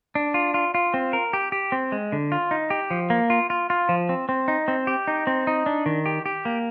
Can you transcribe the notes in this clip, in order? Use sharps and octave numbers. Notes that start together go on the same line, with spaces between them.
D4
F4
F4
F4
C4
A#4
G4
G4
C4
G#3
D3
F4
D#4
G4
F3
A#3
F4
F4
F4
F3
C4
C4
D#4
C4
G4
D#4
C4
D#4
D4
D#3
G4
G4
A#3